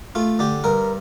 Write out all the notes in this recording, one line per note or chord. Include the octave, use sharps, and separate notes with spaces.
A3 F4
D3 G4
G2 A#4